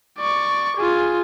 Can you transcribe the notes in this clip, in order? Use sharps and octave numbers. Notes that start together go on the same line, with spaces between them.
D5 C#6
F4 G#4